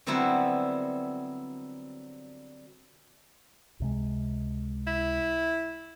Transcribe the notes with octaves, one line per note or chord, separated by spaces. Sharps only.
D3 F#3 G3 B3 C4 E4
C#2 C3 G#3
E4